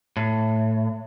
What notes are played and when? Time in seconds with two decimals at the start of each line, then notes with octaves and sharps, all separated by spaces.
0.17 A2